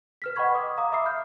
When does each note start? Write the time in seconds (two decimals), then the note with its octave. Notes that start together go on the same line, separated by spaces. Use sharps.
0.22 B4 F6 B6
0.36 D#5 F#5 G5 B5 C#6 G#6
0.55 D6 D#6
0.77 F5 A#5 D6 D#6
0.92 E5 B5 D6 E6 C7
1.06 F6 G6